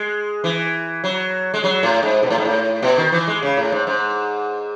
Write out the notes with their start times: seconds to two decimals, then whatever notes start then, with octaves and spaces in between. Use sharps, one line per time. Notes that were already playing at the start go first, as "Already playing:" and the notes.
Already playing: G#3
0.44 E3
1.04 F#3
1.54 G#3
1.64 F#3
1.83 A2
2.03 G#2
2.23 B2
2.30 A2
2.38 G#2
2.45 A2
2.82 B2
2.97 D#3
3.12 E3
3.28 G#3
3.43 C#3
3.57 A2
3.72 G#2
3.87 G#2